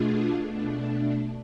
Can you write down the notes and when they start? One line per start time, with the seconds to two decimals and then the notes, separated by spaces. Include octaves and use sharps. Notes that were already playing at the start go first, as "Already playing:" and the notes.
Already playing: B2 A3 D4 F4 G#4
0.47 B2 A3 D4